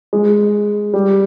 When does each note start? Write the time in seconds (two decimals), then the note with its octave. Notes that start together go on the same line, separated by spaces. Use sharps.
0.13 G#3
0.94 G3